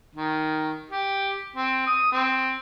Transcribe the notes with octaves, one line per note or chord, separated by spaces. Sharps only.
D#3
G4
C4
D#6
C4